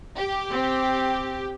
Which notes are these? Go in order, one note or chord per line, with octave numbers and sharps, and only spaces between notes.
G4
C4